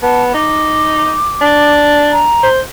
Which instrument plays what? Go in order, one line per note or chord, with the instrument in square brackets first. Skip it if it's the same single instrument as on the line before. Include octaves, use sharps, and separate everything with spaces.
[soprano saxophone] B3 [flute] A5
[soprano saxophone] D#4 [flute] D6
[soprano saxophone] D4
[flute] A#5
[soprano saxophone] C5